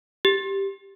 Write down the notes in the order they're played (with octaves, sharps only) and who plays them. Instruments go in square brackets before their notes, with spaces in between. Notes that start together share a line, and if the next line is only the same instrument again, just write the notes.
[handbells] G4